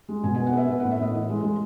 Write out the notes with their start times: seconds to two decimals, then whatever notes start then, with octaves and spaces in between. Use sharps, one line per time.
0.09 G#3
0.24 B2 G#5
0.35 B3 G#5
0.47 F#5
0.53 B3 E5
0.68 B3
0.80 A2 F#5
0.91 E5
0.99 A2 D#5
1.14 E3
1.30 G#3
1.44 G#3